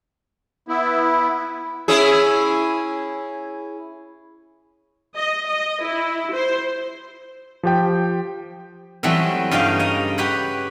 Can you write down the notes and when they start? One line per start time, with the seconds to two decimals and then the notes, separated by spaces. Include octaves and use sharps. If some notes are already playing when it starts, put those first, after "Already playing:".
0.68 B3 E4
1.88 C#4 E4 G#4
5.16 D#5
5.47 D#5
5.84 E4
6.33 C5
7.63 F3 G4 G5
9.03 E3 F#3 G3 A3 B3 C4
9.51 G2 C#3 G4 D#5 F5
9.79 C#5 D#5 A#5
10.18 G4 B4 C#5 F#5